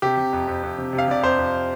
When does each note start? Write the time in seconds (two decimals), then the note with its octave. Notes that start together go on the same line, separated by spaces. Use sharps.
0.02 C3 G4
0.17 C3
0.33 F2
0.48 F2
0.63 F2
0.78 C3
0.93 C3
0.98 F5
1.08 C3 D5
1.23 F2 C5
1.39 F2